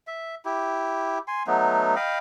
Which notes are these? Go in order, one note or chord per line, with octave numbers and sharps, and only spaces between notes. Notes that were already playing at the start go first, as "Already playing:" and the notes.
E5
E4 G4
G#5 C6
F#3 A3 B3 D#4
D#5 F5 G5 B5